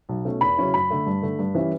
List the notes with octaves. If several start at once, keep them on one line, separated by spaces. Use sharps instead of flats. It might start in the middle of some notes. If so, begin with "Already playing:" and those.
B1
B2 A3 C#4
E2 B5
C#3 F#3 C#4 E4
F#2 B5
D3 A3
G2
D3 A3
G2
E3 G3 C#4 E4